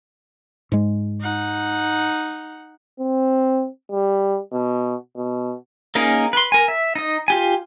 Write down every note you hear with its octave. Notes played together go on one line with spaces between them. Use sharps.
G#2 G#3
D#4 F#5
C4
G3
B2
B2
A#3 C#4 D#4 G#4 A#4
B4 C6
A#4 G#5
E5
D#4 D#5
F4 G4 G#5